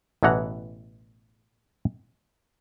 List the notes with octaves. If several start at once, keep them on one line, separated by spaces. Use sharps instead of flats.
A1 B2 E3 F#5 A#5